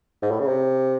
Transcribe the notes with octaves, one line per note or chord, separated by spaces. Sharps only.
G#2
A2
C#3
C3